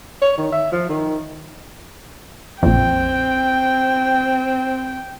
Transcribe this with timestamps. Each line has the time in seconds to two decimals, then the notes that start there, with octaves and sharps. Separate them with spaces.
0.21 C#5
0.38 D#3
0.52 E5
0.72 F3
0.89 D#3
2.63 A#1 F2 C4 G5